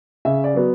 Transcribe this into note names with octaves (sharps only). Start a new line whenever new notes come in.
C#3 E5
D5
F#3 B3